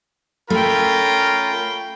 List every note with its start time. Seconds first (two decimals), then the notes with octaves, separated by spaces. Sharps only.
0.50 A3 C#4 F4 A#4 G5 B5